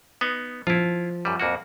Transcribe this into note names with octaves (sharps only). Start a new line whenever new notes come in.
B3 D#4
F3 E4 F4
F#2 G3
F2 A#3 F#4